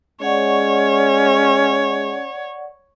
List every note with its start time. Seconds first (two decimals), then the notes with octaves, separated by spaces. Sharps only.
0.21 G#3 C#4 C#5 D5 F#5 C#6